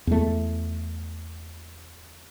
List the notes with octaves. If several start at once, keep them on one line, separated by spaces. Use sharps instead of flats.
E2 A3